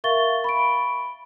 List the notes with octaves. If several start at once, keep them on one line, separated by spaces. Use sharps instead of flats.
A#4 E5 F5 C#6 A6 G7
B5 C#6 D7